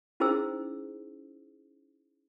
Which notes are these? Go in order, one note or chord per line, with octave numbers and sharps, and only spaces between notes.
C#4 D#4 E4 G#4 C5 E6